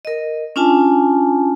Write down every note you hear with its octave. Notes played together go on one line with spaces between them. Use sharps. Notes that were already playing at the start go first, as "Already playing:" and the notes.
A#4 D#5
C#4 D4 F4 G#5 A5